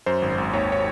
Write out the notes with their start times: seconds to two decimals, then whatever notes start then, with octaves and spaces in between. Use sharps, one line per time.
0.06 F#2 C5
0.22 G#1
0.38 G#1
0.53 D#2 C#5
0.72 C#5